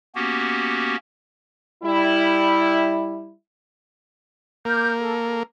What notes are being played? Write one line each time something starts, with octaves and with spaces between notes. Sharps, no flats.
A#3 B3 C#4 F#4 G4
G3 E4
A#3 D6 F6 G6
A4